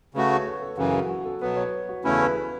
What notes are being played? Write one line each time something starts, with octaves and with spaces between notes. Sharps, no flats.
C#3 A3 F#4 B4
C#5
B4
A4
F#2 C#3 E3 F#4
F#4
F#4
A4
B2 F#3 B3 B4
C#5
F#4
E2 C#3 A3 C#4 E4 B4
B4
B4